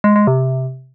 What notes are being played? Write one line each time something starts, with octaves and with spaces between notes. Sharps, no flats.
G#3
G#3
C3